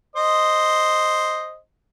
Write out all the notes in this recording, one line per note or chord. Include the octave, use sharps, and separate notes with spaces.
C5 D#5